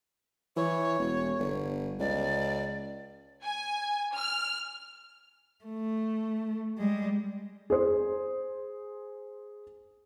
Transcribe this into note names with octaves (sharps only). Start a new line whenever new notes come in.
E3 C#5
E1
G1
C#2 D5
G#5
F6
A3
G3 G#3
G#4 C5